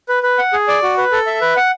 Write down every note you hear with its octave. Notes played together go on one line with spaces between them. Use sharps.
B4
B4
F#5
G#4
D5
F#4
B4
A4
E5
B4
F#5